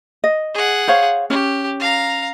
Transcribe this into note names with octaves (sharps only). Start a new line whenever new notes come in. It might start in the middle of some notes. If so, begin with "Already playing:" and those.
D#5
G#4 F#5
C5 C#5 F5
C#4 G4
F5 A#5